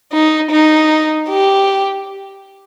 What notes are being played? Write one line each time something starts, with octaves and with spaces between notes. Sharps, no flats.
D#4
D#4
G4